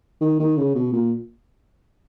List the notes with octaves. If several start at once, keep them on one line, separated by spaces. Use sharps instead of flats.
D#3
D#3
C#3
B2
A#2